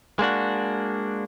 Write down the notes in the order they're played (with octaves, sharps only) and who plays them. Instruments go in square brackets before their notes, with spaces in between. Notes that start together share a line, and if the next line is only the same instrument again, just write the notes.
[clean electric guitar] G#3 A#3 D4 F#4